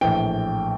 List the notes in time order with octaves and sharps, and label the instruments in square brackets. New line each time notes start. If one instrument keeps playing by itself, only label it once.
[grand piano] A#1 A2 E3 G5